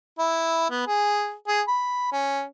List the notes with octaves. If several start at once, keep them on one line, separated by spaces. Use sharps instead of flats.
E4
B3
G#4
G#4
B5
C#4